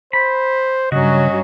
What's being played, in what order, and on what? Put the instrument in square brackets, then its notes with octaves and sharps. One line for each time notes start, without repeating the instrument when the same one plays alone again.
[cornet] C5 [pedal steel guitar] B5
[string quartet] G2 F#3 C#4 [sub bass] C#3 [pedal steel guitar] F#4 [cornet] D#5